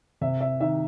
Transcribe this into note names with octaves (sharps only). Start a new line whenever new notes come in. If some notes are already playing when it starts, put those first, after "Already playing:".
C3 E5
E5
D#3 E5